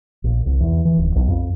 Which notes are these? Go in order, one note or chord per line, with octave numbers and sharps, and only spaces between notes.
A#1
C2
E2
E3
D1
B1
F2